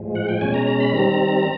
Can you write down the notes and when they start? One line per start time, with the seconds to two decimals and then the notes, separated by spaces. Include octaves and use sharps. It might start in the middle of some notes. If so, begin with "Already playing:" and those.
Already playing: A2 F3 G#3
0.15 F#5
0.29 G5
0.41 B2 G#3 C#4 G#5
0.54 A#5
0.67 A#5
0.80 B5
0.93 D#3 G3 C4 A#5